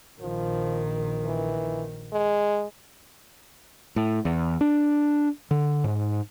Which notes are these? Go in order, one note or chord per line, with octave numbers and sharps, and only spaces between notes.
A#1 D#3 F3
E3
G#3
A2
E2
D4
D3
G#2